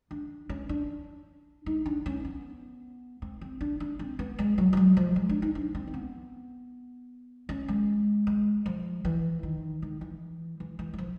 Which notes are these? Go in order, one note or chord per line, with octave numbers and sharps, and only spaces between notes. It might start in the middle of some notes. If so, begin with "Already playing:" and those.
D4
C#4
D4
D#4
D4
C#4
B3
C4
C4
D4
D4
C4
B3
G#3
F#3
F3
F#3
F3
G#3
D4
D#4
D4
C4
A#3
B3
C#4
G#3
G#3
F3
E3
D#3
D#3
E3
E3
E3
F#3
F3